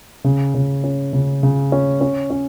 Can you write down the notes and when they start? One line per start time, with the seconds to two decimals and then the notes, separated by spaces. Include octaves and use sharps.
0.24 C#3
0.55 C#3
0.84 C#4
1.13 C#3
1.43 C#3
1.72 C#4
2.01 C#4
2.30 C#4